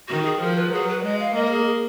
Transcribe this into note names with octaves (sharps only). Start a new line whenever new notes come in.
D#3 F#4
G#4
F3 A#4
B4
F#3 G#4
B4
G#3 D#5
F5
A#3 D#5
A#4
G#4
G#4